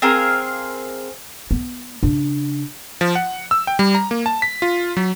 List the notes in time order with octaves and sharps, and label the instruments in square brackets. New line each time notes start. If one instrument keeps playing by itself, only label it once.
[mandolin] C4 G#4 A#4 F5
[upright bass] B3
C#3 D4
[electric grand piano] F3
F#5
E6
G5
G3
A#5
A#3
A5
B6
F4
F#3